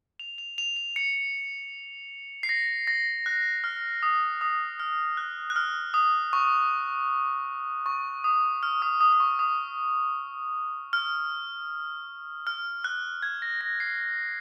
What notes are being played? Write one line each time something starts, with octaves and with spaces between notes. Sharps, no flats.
F7
F7
F7
F7
C#7
C7
A#6
A#6
F#6
F6
D#6
D#6
F6
F#6
F#6
F6
D#6
C#6
C#6
D#6
F6
D#6
D#6
D#6
C#6
D#6
F6
F6
F#6
G#6
A#6
A#6
C7